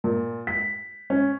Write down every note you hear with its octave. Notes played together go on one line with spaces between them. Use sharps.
A#2
B6
C#4